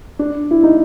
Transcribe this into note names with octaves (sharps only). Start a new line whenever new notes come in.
D4
E4
D#4